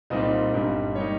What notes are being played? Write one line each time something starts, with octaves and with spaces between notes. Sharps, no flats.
C2 A#2 G3 C4 D#4 D#5
G1 G2 G3 C4 D#4
G3 A#3 D#4 C#5